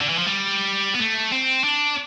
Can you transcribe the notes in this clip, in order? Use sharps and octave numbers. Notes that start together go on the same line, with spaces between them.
D3
E3
F3
G3
B3
A3
C4
D4